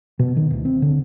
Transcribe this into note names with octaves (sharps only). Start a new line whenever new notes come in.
B2
D#3
D1
C4
D3